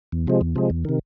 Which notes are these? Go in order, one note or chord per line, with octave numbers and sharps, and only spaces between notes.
E2
C3 F3 G#3
E2
C3 F3 G#3
E2
C3 D#3